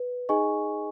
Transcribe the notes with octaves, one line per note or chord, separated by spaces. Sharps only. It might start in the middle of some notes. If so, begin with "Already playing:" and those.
Already playing: B4
D#4 G#4 D#5 G#5 C#6